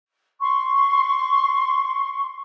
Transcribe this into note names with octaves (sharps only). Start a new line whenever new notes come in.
C6 C#6